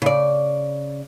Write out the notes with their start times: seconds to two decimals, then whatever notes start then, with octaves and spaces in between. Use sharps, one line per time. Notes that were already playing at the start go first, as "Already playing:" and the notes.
0.02 C#3 D5